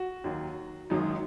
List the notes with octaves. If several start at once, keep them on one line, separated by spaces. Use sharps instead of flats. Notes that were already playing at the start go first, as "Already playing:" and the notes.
Already playing: F#4
D#2 D#3 F#3
G#1 F#2 D#3 F#3 D#4